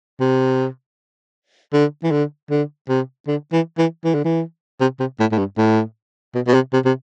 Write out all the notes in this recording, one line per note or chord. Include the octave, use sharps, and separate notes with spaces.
C3
D3
E3
D3
D3
C3
D3
E3
E3
E3
D3
E3
C3
C3
A2
A2
G2
A2
B2
B2
C3
C3
C3